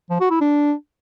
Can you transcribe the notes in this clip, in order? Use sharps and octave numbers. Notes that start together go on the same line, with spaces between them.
F3
F#4
E4
D4